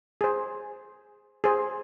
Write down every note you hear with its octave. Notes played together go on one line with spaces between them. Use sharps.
G#4 C5
G#4 C5